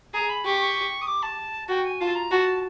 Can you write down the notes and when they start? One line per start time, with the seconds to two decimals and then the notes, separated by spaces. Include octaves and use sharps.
0.14 G#4 A#5
0.29 B5
0.45 G4 C#6
0.60 C#6
1.01 D#6
1.07 D6
1.22 A5
1.68 F#4 G5
1.85 G#5
2.01 F4 A5
2.15 A#5
2.31 F#4 A5